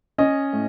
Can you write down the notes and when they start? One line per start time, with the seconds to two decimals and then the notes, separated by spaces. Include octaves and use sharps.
0.18 C#4 D#5
0.53 A2